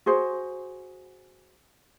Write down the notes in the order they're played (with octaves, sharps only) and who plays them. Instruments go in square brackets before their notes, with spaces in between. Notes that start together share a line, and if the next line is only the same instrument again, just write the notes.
[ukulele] F#4 G#4 C5